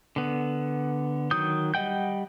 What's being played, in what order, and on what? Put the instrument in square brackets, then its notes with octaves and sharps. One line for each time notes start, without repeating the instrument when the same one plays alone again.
[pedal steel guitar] D3 B3
D#3 F#3 D#6 G6
G3 D#5 F#5 G5 G6